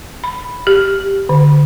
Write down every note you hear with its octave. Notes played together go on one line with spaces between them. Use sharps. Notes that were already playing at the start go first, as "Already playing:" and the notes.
B5
G4
D3